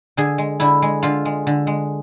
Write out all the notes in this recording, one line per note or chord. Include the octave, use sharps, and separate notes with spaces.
D3 G#4
G#3
D3 E4
G#3
D3 F4
G#3
D3
G#3